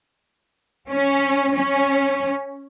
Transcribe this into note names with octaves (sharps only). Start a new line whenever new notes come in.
C#4
C#4